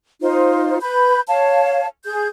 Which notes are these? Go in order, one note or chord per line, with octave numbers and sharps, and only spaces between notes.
D#4 F4 C5
B4 B5 G6
C#5 F5 A5
G#4 G6